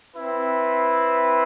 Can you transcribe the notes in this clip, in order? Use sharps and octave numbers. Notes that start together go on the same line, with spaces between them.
C4 E4 B4